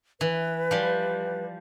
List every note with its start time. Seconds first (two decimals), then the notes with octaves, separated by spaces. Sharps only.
0.21 E3 B4
0.71 F3 G3